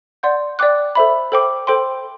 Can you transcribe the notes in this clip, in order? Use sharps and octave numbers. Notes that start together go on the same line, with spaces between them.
D5 F#5 C6 G6
D5 G5 D6 F#6
A4 C5 E5 B5
A4 C5 G5 D6
A4 C5 G5 C6